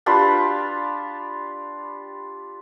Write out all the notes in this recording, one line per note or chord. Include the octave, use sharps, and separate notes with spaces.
D4 F4 G4 B4